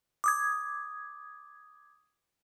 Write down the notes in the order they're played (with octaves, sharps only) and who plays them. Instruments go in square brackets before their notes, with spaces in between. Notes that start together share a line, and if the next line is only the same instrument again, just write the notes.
[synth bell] D6 D#6 G#6